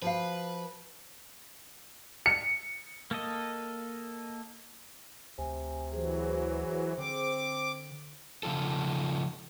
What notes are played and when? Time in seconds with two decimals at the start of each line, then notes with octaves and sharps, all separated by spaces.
0.02 F3 F#4 B4 F5
2.26 C#7
3.11 A#3 A4 D#5
5.38 D2 C3 G#5
5.92 E3 F#3 G#4 C5
6.98 D3 C4 D6
8.43 C#3 F3 F4 A4